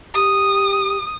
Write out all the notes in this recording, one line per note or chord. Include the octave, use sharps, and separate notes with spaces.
G4 D#6